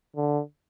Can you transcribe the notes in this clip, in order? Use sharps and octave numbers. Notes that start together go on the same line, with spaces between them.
D3